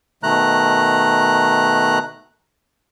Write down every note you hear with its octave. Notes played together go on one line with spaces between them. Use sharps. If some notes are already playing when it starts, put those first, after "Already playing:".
B2 D#3 A3 A#5 F#6